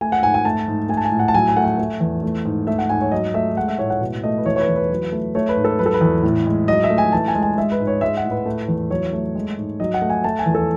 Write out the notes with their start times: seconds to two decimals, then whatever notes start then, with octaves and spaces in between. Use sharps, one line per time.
0.01 A3 G#5
0.12 F#5
0.22 G#2 G#5
0.34 G#5
0.45 A3 A5
0.68 G#2
0.89 A3 G#5
0.97 A5
1.05 G#5
1.12 A2
1.19 F#5
1.28 A5
1.34 F#3 G#5
1.48 G#5
1.56 A3 F#5
1.64 G#5
1.78 A3
2.00 E2
2.23 A3
2.45 G#2
2.67 A3 E5
2.78 F#5
2.89 G#2 G#5
3.01 C#5
3.12 F#3 D#5
3.34 A3 E5
3.57 G#3 F#5
3.68 E5
3.79 A2 C#5
3.90 F#5
4.01 B2
4.23 A3 D#5
4.38 B4
4.45 E3 C#5
4.56 C#5
4.60 B4
4.68 E2
4.76 B4
4.91 F#3
5.12 A3
5.35 A3 C#5
5.49 B4
5.57 G#2
5.64 A4
5.79 F#3 B4
5.86 A4
5.94 B4
6.01 E2
6.23 A2
6.46 G#3
6.68 F#3 D#5
6.84 E5
6.90 A3
6.98 G#5
7.12 E3 A5
7.28 G#5
7.35 G#3
7.42 G#5
7.58 G#3 E5
7.72 B4
7.80 G#2
7.87 C#5
8.01 G#3 E5
8.17 F#5
8.24 A2
8.31 B4
8.46 A3
8.68 E2
8.90 F#3 C#5
9.13 A3
9.35 G#3
9.58 G#2
9.80 F#3 D#5
9.94 F#5
10.02 A3
10.09 G#5
10.24 A3 A5
10.39 G#5
10.46 E2
10.55 A4